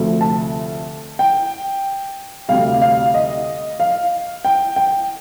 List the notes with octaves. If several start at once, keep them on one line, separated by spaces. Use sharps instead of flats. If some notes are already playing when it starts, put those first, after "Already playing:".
Already playing: D2 C3 F3 A3
A5
G5
D2 C3 G3 F5
F5
D#5
F5
G5
G5